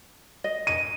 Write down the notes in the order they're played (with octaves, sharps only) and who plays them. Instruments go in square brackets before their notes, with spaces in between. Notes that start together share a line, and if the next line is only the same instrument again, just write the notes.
[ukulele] D#5
[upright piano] D#7